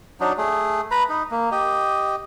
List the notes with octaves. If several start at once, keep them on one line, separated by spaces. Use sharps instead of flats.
F#3 D4 D#4
A3 G#4
B4 A#5 B5
D#4
A#3
G4 D#5